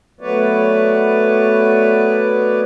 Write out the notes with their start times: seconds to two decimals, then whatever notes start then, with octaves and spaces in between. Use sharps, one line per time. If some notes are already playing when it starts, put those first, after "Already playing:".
0.21 F#3 A3 B3 B4 C#5 D5